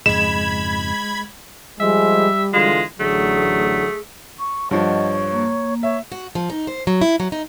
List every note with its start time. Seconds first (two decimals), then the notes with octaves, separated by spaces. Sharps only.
0.06 F2 G#2 C#3 G#3 B5 G#6 E7
1.80 F3 G3 G#3 E5
2.54 D3 E3 G#3 F4
3.00 A1 D3 F#3 A3 G#4
4.39 C#6
4.71 G2 F3 C#5 D#5 F#5
5.32 A#3
5.83 C#5 E5
6.12 F#4
6.35 F3
6.50 D#4
6.67 C5
6.87 F#3
7.01 E4
7.20 F#3
7.32 D#4